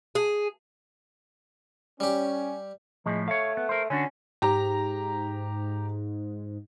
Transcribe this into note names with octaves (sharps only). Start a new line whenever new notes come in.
G#4
G3 C#4 G4
A2 F3 G#3
A3 C#5 F5
B3
A#4 C5
D3 C#4 D4 F#4
G#2 G4 A#5